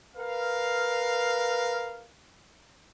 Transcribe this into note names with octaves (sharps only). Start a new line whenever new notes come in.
A#4 B4 F5